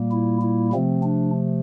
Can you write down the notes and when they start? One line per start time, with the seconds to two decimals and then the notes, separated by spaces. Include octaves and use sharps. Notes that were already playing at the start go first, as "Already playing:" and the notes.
Already playing: A#2 G3 A#3
0.12 E4
0.42 E4
0.73 C3 F3 A3 C4
1.03 D4